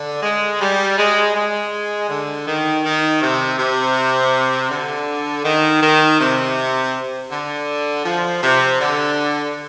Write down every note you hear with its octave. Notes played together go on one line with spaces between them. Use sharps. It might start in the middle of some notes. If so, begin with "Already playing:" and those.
Already playing: D3
G#3
G3
G#3
G#3
D3
D#3
D#3
C3
C3
D3
D#3
D#3
C3
D3
F3
C3
D3